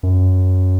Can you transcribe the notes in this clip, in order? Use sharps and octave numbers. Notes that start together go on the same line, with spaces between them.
F#2